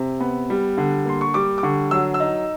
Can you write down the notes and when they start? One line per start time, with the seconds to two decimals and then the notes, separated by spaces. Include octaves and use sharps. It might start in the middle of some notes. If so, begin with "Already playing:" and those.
Already playing: C3
0.20 B3
0.50 G3
0.78 D3
1.06 A#3 C6
1.21 C#6
1.34 G3 D6
1.58 D6
1.63 D3 C#6
1.91 F#3 E6
2.14 E6
2.20 D#4